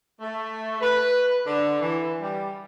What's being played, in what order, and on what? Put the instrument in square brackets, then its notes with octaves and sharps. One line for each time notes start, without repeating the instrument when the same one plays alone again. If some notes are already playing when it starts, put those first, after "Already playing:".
[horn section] A3
B4
D3
E3
G3